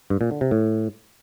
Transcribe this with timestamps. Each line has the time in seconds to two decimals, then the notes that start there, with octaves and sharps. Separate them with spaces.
0.10 G2
0.21 A#2
0.31 D3
0.41 C3
0.51 A2